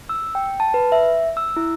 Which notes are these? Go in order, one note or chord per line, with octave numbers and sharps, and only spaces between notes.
E6
G5
A5
B4
E5
E6
E4